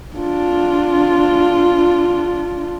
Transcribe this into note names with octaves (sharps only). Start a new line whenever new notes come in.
D4 F4